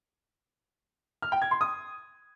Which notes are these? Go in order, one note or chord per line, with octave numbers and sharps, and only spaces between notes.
F6
G5
G#6
C6
D#6